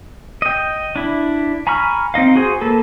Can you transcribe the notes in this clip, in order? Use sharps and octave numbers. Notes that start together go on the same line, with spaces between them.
D#5 G5
D4 E4
G#5 A#5 B5 C#6 F6
C4 D#4 D#5 F5
F#4 G#4 C5
A#3 A4 B4